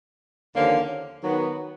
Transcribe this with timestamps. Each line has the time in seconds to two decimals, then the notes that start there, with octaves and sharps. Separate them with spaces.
0.55 D#2 D3 F3 A#3 C#4
1.23 D#3 F#3 B3